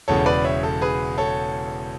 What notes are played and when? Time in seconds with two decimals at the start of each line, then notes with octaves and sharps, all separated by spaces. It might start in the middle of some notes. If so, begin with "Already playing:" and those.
0.08 E1 E2 C#3 A4 C#5
0.26 B4 D5
0.45 C#5 E5
0.63 A4
0.81 G#4 B4
1.18 A4 C#5